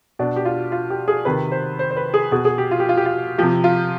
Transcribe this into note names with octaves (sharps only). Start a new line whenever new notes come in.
B2 D4
G4
F4
F4
G4
G#4
C3 D#3 B4
C5
C5
C5
B4
G#4
B2 G#4
G#4
G4
F4
G4
F4
G4
F4
C3 F3 G4
F4